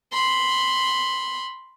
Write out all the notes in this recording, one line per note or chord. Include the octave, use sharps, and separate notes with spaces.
B5 C6